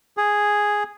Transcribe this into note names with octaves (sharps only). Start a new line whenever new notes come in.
G#4